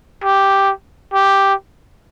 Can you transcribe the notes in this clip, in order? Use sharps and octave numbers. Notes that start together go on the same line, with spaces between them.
G4
G4